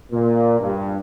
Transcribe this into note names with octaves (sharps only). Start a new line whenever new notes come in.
A#2
G2